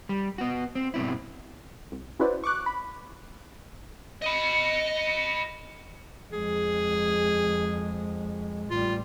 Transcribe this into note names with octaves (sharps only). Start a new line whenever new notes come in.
G3
B3 F#4
C4
G2 B2 C4 E4
C2
C#4 E4 F#4 B4 C5 D5
C#6 D6 F#6
B5
D#5 B5
F2 G#3 G#4
A1 G3 F4